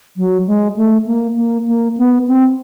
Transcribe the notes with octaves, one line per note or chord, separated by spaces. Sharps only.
F#3
G#3
A3
A#3
A#3
A#3
B3
C4